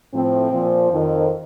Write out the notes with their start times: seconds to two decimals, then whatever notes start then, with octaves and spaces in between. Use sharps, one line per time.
0.13 A2 F3 C4
0.52 A#2 F3
0.91 F2 D#3